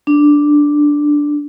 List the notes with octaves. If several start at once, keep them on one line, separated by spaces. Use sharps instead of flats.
D4